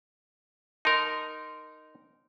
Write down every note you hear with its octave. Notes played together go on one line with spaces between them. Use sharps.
D#4 A#4 A5 C6